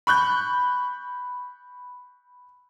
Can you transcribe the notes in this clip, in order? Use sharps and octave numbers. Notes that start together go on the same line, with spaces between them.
B5 C#6 F#6 G6